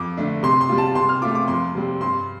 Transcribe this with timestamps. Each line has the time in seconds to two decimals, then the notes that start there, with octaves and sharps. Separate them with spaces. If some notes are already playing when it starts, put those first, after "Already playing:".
Already playing: F2 D6
0.17 D3 A3 D4
0.43 C3 C6
0.61 C6
0.69 G3 F4
0.78 A5
0.95 C3 C6
1.09 F6
1.22 A3 F4 D6
1.35 D6
1.48 F2 C6
1.75 C3 G3 C4
2.01 G2 C6